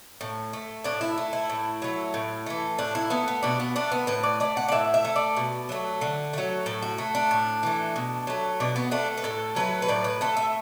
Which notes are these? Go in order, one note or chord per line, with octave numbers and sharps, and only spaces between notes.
A2
A3
A2 D4
E4
A3
E4
A2
F#3 A3
A2
E3 A3
A2 D4
E4
A3 B3
B3
B2 D4
B3
A3 D4
B3
A2 B4
D5
A3 D5
F#5
D5
A2 E5
E5
A3
D5
B2
F#3 A3
D3
F#3 A3
A2 A4
F#4
A3
D4
A2
E3 A3
B2
F#3 A3
B2 D4
B3
A3 D4
B4
A2 A4
F#3 A3 B4
B4
A2 D5
B4
A3 A4
E5